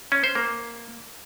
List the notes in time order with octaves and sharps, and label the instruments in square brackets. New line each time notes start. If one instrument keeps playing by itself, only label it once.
[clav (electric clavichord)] C#4
C5
A#3